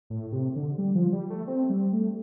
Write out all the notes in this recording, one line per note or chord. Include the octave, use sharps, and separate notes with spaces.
A2
C3
D3
G3
F3
G3
A3
C4
G3
A3